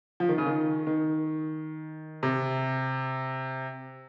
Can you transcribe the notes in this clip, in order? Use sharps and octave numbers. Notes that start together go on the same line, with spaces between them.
F3
D#3
C#3
D#3
D#3
C3